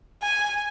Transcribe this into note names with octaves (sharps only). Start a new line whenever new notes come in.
G#5